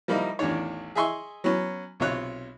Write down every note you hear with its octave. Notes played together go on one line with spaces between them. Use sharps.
F3 G3 A#3 D#4 E4
A1 E2 D#3 D4 C#5
G#4 D#5 E5 G#5 C6 C#6
F#3 B3 C#4
B1 C3 F4 C#5 F#6